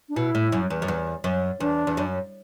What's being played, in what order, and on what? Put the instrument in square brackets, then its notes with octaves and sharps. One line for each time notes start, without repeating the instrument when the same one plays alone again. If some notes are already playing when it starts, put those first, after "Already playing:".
[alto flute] D4
[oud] B2 [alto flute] E4
[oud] A2
F#2
E2
F#2
E2
F#2
[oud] E2 [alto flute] D4
[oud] E2
F#2